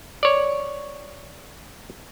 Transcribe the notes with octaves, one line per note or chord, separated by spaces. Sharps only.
C#5 D5